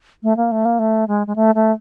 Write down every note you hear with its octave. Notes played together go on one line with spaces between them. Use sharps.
A3
A#3
A3
A#3
A3
G#3
G#3
A3
A3